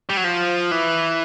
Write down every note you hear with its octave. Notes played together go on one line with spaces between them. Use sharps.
G3
F#3
F3
E3